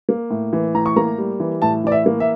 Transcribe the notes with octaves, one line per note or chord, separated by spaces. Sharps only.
A#3
A2
E3
A2 A#5
C#6
A#3 A#5
G3
E3
A2 A5
E3 D5
E5
A#3
E5